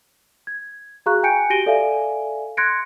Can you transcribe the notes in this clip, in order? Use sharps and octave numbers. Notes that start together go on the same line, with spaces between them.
G#6
F#4 G#4 F5 A#5 C#6 F#6
G5 G#5 G6 C#7 D7
F#4 G4 A#6 D7 D#7 G7
A4 D5 E5 F5 G#5
C6 F#6 G#6 A#6 C#7 D7